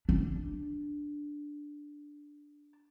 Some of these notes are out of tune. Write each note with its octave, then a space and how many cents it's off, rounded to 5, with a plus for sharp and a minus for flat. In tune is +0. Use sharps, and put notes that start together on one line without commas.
D4 +0